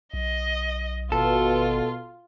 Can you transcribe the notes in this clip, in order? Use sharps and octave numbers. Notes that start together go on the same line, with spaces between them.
B1 D#5
G#1 B2 F4 A4